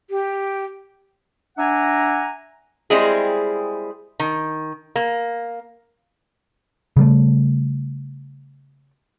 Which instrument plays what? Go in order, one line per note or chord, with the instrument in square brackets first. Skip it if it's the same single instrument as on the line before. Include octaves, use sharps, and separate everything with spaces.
[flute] G4
[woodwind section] D4 E5 F#5 G#5 A#5
[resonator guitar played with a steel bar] G3 G#3 C4 E4 G#4
D#3
A#3
[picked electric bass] C#3 G3 A3